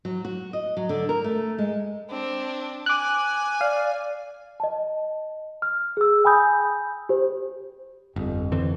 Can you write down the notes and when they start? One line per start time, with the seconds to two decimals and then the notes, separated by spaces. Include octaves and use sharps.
0.05 F#3
0.25 F#4
0.53 D#5
0.77 F#3
0.89 D3
1.09 A#4
1.24 A3
1.58 G#3
2.10 C4 D4
2.86 G#5 D6 F#6
3.61 D5 F5
4.60 D#5 A5
5.62 F6
5.97 G#4 E6
6.24 G5 G#5 B5 D#6 G6
7.09 G4 C5
8.16 G1 F2
8.52 D3 E3 C4